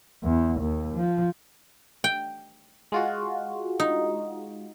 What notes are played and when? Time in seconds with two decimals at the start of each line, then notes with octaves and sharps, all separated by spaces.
0.23 E2
0.60 D#2
0.94 F3
2.04 G5
2.92 G#3 F4 F#4
3.80 D#4